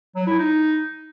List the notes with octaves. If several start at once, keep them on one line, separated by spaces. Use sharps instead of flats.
F#3
E4
D#4